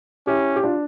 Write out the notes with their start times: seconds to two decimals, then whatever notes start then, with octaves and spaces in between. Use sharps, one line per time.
0.27 C#4 E4 G4
0.56 G4
0.64 D4 F4